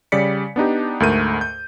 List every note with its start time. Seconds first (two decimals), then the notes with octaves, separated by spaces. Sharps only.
0.12 C#3 G3 D5 B6 C#7
0.56 B3 D4 D#4 G4
1.00 D2 G#2 A3 A#4 G6 D#7
1.41 G6